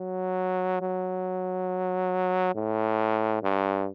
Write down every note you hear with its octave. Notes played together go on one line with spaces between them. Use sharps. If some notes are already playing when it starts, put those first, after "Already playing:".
Already playing: F#3
F#3
A2
G2